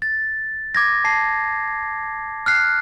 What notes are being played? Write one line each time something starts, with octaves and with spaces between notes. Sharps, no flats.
A6
D6 G#6 A#6
A5 C7
F6 F#6 C7